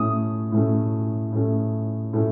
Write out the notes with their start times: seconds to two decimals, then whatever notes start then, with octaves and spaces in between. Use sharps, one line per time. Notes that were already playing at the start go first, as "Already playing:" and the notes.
Already playing: A2 A3 C#4 D#6
0.52 A2 A3 C#4
1.32 A2 A3 C#4
2.13 A2 A3 C#4